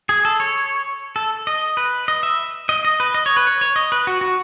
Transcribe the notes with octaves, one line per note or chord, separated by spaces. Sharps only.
G#4
A4
C#5
A4
D#5
B4
D#5
E5
D#5
D#5
B4
D#5
C#5
B4
C#5
C#5
D#5
B4
F#4
F#4